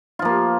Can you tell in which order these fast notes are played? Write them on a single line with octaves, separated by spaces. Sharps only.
F4 F3 A#3